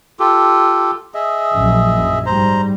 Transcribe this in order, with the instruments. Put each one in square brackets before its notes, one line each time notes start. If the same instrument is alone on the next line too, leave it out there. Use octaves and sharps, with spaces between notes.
[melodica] F4 G4 A4
G#4 D#5 E5
[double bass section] A#1 F#2
[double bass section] G#2 G3 [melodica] C5 A#5